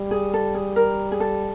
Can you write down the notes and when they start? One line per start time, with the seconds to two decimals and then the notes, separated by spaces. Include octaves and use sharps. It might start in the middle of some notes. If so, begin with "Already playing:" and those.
Already playing: G3
0.11 G#4
0.34 A4
0.54 G#4
0.76 A#4
1.12 G#4
1.20 A4